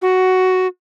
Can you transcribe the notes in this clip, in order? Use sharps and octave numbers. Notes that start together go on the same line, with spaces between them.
F#4